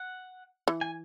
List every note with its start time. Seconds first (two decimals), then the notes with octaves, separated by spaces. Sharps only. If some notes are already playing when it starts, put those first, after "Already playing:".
Already playing: F#5
0.68 E3
0.81 G#5